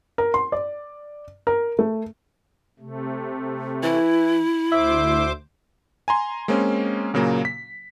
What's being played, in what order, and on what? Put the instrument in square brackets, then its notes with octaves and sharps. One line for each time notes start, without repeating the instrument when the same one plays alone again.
[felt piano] A#4
C6
D5
A#4
A3
[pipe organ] C3 A3
[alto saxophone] E3 [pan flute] E4
[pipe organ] D2 C5 D6 [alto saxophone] E5
[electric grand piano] G#5 A#5 C6
G#3 A#3 C4 C#4
A#2 C#3 F#3 A#3
B6